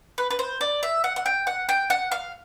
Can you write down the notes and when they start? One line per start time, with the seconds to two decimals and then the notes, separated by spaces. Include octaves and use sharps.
0.18 B4
0.30 B4
0.39 C5
0.61 D5
0.83 E5
1.04 F#5
1.16 F#5
1.26 G5
1.47 F#5
1.69 G5
1.90 F#5
2.12 F5